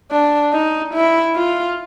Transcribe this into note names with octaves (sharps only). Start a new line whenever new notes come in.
D4
D#4
E4
F4